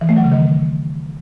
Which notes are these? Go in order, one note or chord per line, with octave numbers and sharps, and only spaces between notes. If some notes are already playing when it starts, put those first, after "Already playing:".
E3
A3
F#3
C#3
D#3